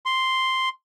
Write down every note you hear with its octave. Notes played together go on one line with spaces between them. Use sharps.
C6